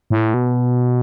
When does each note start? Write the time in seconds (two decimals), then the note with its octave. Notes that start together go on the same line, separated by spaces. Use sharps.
0.10 A2
0.34 B2